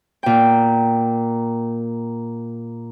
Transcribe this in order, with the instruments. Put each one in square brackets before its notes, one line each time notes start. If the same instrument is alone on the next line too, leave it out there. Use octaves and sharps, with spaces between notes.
[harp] A#2 G5